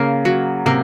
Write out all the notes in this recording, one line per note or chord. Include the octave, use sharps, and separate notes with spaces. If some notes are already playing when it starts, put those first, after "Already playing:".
Already playing: C#3 A#3
F#3
C3 A#3